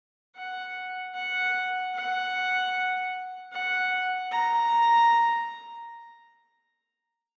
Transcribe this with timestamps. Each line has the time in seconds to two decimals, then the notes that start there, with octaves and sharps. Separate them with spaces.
0.36 F#5
1.14 F#5
1.95 F#5
3.53 F#5
4.31 A#5